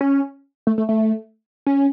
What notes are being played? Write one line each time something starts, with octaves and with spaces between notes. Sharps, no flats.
C#4
A3
A3
A3
C#4